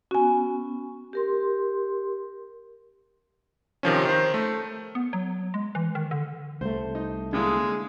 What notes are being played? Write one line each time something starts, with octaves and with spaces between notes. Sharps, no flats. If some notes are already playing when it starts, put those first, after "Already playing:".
B3 C#4 F#4 G#5
G4 A#4 C6
C3 D#3 F3 C#4
D#3 C5
A3
B3
F#3
G#3
E3
D#3
D3
C2 A3 C5
D#4
D3 G#3 A#3 E4